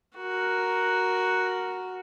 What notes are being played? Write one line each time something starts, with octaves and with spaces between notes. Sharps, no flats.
F#4 A#4